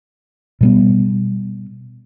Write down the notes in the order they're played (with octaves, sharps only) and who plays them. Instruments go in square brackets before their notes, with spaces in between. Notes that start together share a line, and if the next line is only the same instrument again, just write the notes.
[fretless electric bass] B2 G3 B3